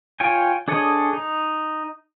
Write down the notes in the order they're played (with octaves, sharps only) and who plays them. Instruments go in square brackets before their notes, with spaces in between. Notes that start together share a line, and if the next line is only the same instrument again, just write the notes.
[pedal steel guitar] F4 C#5 G5 G#5
D4 G#4 A4 C#5 D#5
D#4